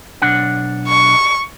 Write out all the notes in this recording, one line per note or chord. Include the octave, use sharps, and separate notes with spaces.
B1 D4 F#5
C#6